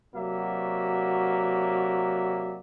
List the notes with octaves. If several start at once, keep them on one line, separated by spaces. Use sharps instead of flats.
C3 F#3 A#3 F#4 D5 E5